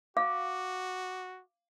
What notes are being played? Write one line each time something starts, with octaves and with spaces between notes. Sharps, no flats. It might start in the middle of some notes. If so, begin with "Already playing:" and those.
F#4 F5 D6